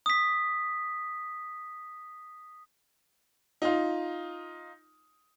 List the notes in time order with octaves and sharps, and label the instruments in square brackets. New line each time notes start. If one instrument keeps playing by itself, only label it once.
[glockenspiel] D#6 B6
[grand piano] D#4 F4